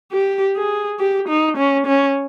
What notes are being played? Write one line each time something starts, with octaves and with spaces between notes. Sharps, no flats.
G4
G#4
G4
D#4
C#4
C#4